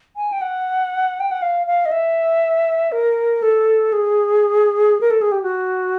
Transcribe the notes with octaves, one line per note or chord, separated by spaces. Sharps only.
G#5
G5
F#5
G5
F#5
F5
F5
D#5
E5
A#4
A4
G#4
A#4
A4
G#4
G4
F#4